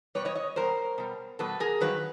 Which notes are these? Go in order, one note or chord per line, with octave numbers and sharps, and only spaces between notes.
B2 G3 B4 C#5
C#5 D#5
C#5 D#5
B2 G3 A#4 C5
B2 G3
B2 G3 A4 B4
G#4 A#4
G2 D#3 F#3 B4